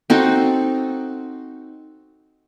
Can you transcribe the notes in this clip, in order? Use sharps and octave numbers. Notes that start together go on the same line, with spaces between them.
C4 D#4 F#4 A4